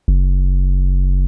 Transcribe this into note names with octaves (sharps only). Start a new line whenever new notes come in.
F#1